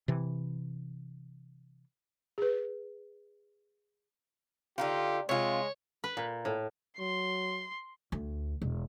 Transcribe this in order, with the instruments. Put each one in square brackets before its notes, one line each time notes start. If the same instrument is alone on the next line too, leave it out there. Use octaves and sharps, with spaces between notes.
[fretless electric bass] C3 E3
[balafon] G#4 B4
[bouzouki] D3 D#4 F4 [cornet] G4
[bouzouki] C3 F4 [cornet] G#3 [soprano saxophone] C#5
[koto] B4
A#2
A2
[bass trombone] F#3 [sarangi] C6
[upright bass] D2
E1